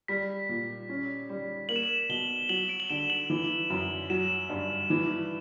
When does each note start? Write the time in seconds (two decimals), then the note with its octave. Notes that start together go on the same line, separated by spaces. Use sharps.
0.08 G3 B6
0.49 A#2
0.89 C#4
1.29 G3
1.69 A#3 F#7
1.76 E7
1.83 F#7
2.09 B2 G7
2.49 F#3 F#7
2.69 D7
2.80 F#7
2.90 D3 E7
3.10 F#7
3.30 E3
3.70 F#2
4.10 F#3 E7
4.49 G2
4.90 E3